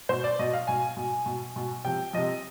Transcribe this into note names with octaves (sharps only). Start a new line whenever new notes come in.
B2 C5
D5
B2 D#5
F5
B2 G#5
B2
B2
B2
C3 F3 G5
C3 F3 D#5